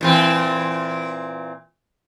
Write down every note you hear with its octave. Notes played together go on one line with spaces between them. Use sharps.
A#2 E3 C4